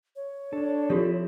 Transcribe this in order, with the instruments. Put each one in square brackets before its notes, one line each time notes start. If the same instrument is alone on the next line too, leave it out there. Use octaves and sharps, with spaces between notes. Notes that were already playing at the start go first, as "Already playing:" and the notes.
[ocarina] C#5
[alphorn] D4 [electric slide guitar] A4
[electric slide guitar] F3 C4 E4 [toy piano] F4 G4 A4